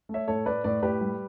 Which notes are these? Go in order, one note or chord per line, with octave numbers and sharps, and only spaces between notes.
A3
C#5 E5
A2 A4 C#5
A3 B4 D5
A2 B4 D5
A2 G4 B4
G3